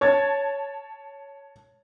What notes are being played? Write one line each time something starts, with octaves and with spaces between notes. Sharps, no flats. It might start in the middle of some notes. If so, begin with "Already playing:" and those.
C#5 A5 G#6 A6